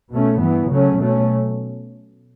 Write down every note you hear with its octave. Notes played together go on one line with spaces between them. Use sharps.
B2 A3 C#4
G2 E3 B3
C#3 F#3 A3 C#4
B2 F#3 A3 C#4